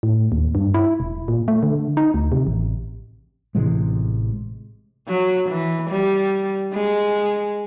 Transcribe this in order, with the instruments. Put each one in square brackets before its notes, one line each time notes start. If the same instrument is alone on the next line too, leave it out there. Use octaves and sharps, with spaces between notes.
[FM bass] A2
D#2
G2
E4
E1
A#2
A3
D3
D#4
D2
C3
A1
[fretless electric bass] A1 C3 E3 G#3
[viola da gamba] F#3
E3
G3
G#3